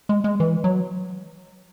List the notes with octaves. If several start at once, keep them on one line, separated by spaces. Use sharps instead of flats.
G#3
G#3
E3
F#3